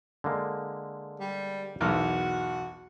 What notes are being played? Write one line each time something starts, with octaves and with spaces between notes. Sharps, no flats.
D3 G#3 A#3
G3
B1 E2 F#4 A#4 F6